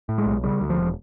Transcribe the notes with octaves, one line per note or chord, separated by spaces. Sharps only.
A2
G#3
B1
C#3 G3
D2
F3
E1